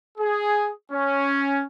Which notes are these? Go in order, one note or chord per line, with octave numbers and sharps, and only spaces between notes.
G#4
C#4